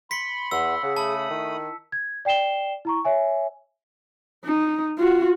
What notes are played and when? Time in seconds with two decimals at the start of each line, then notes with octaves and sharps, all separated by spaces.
0.11 B5 C6 B6 C#7
0.51 E2 F#5 E6
0.83 C#3 G#4 F#5
0.97 A3 A5 B5 D#6
1.30 D#3 E4
1.92 G#6
2.25 D5 G5 C7 E7 G7
2.85 E4 A#5 C#6
3.05 C#5 E5 G#5
4.45 D#4
4.98 F4 F#4